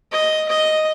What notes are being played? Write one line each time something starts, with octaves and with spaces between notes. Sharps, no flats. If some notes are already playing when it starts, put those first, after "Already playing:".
D#5
D#5